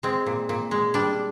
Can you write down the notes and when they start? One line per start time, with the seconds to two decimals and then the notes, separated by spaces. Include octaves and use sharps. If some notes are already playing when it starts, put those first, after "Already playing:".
0.03 G#3 C4
0.26 A#2
0.49 A#2
0.71 G#3
0.94 G3 D4